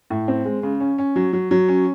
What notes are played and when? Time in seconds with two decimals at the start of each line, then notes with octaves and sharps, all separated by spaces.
0.10 A2
0.28 C4
0.45 G#3
0.63 C#3
0.80 C#4
0.98 C#4
1.16 F#3
1.33 F#3
1.51 F#3
1.68 C#4